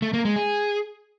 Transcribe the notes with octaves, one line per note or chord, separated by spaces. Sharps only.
A3
A#3
G#3
G#4